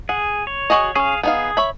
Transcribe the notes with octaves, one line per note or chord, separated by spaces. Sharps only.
G#4 F#5
C#5
F#4 G#4 D#5
C#4 G#4 F5
B3 D#4 G#4 F5
C#5 E5 B5